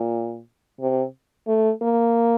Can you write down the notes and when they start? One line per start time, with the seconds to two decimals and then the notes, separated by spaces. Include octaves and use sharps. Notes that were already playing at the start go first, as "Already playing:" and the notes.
Already playing: A#2
0.80 C3
1.48 A3
1.82 A#3